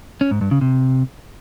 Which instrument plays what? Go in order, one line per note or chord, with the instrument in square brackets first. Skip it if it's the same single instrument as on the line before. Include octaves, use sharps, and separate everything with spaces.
[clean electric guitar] C#4
G#2
G2
C#3
C3